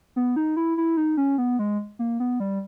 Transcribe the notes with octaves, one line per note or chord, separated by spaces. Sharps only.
B3
D#4
E4
E4
D#4
C#4
B3
G#3
A#3
B3
G3